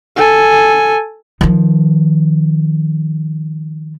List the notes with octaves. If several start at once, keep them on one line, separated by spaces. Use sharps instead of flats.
A4 G#5
D#3 F3